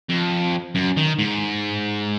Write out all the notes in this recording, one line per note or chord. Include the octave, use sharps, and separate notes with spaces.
F2
F#2
D#3
G#2